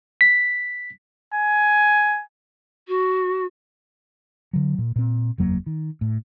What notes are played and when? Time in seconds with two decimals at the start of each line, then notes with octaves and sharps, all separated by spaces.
0.21 B6
1.34 G#5
2.88 F#4
4.53 D3 F#3
4.78 A#2
4.96 A#2 C4
5.38 F#1 E2 F#3 A#3
5.66 D#3
6.01 A2